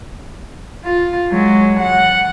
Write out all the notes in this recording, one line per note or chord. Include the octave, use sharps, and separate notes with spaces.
F4
F#3 G#3
F#5